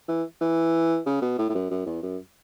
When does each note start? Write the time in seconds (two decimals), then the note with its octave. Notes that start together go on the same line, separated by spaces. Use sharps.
0.08 E3
0.41 E3
1.06 C#3
1.22 B2
1.38 A2
1.50 A2
1.55 F#2
1.71 F#2
1.86 E2
2.03 F#2